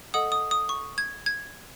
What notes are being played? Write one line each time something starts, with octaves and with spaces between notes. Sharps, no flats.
A4 D#5 F#5 D#6
D#6
D#6
C#6
G#6
G#6